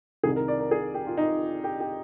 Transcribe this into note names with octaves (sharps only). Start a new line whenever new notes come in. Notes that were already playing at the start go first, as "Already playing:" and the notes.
C2 C3 D#3 G#4
A#4
D5
A#4
G#4
G4
F4
D#4
G4
G4